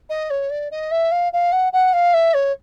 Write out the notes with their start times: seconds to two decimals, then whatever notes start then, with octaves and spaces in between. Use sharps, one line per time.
0.10 D#5
0.30 C#5
0.50 D5
0.71 D#5
0.91 E5
1.12 F5
1.33 F5
1.52 F#5
1.73 F#5
1.93 F5
2.14 E5
2.34 C#5